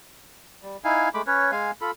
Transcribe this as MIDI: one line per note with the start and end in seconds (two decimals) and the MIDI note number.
0.63 0.77 55
0.84 1.09 63
0.84 1.09 64
0.84 1.09 77
0.84 1.09 80
1.14 1.22 56
1.14 1.22 57
1.14 1.22 83
1.14 1.22 86
1.27 1.51 61
1.27 1.51 71
1.27 1.51 73
1.52 1.71 56
1.52 1.71 77
1.52 1.71 80
1.81 1.91 65
1.81 1.91 69
1.81 1.91 83